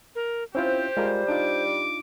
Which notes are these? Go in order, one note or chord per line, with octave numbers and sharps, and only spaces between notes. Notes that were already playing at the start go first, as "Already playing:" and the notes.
A#4
C4 C#4 E4 F4 G4 C5
G3 G#3 F4 A#4
D4 D#4 F4 D6